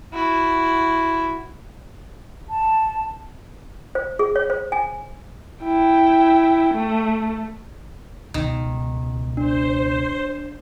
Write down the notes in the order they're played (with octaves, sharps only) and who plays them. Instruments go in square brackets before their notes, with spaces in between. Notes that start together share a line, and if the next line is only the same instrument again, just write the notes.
[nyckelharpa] E4 F#4
[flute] A5
[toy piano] C5
G#4
C#5
C5
G#5
[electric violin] E4 G5
A3
[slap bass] C#2 B2 G#3 [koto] D#3
[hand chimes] D4 [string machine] C5